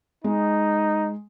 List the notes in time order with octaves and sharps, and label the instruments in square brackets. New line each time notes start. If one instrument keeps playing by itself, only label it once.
[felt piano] G#3 [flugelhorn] D#4